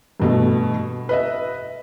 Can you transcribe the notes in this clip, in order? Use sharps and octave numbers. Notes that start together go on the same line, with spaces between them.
G2 B2 A3
B4 D#5 E5